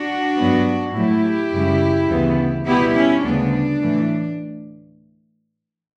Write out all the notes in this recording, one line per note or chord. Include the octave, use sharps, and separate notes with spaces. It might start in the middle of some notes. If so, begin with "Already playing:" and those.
Already playing: D4 F#4
G2 F#3 B3
A2 F#3 A3 E4 G4
F#2 C#3 G3
D2 C#3 E3 B3
B2 G3 B3 E4 G4
C#4 E4
D2 C#3 G3 B3 D4
A2 E3 A3